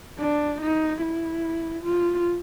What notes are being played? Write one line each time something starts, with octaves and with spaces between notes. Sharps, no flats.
D4
D#4
E4
F4